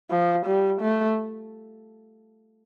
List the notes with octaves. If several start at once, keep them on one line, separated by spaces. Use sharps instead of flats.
F3
G3
A3